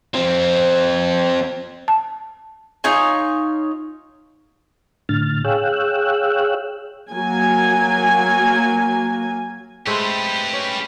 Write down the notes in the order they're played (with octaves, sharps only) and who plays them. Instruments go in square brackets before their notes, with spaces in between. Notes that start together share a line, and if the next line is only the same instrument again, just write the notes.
[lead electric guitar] F3 C4
[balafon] A5
[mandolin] D#4 F4 C#5 G#5
[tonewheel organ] A2 D3 F6 A6
G#4 C#5 F5 G5 E6 F#6
[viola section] F#3 A#3 G#5
[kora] G#3 A3 C4 [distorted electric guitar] G4 B4
[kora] C#4